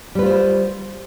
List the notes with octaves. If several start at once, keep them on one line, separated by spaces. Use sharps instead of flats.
G3 F4 B4 C5